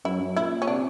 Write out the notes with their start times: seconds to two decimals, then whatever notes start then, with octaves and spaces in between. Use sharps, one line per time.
0.05 F#2 E4
0.20 F#2
0.36 A#2 E4
0.62 C#4
0.67 C3 D4